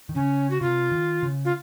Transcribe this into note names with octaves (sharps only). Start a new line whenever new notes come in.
D#3
C#3 C#4
F#4
C3 F4
D#3
C#3
F4